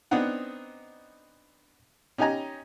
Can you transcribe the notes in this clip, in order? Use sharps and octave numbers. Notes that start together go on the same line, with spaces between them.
B3 C4 D4 D#4 F#5
C#4 D#4 G4 D#5 G#5 A#5